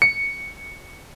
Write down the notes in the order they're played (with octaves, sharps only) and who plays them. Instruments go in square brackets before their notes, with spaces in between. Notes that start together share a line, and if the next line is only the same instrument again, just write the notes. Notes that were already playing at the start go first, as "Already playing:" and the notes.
[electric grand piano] C#7